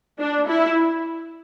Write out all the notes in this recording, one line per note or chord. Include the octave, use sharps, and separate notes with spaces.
D4
E4